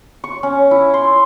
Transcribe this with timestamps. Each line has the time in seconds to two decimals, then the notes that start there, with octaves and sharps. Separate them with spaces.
0.24 C#6
0.43 C#4
0.71 E4
0.94 C6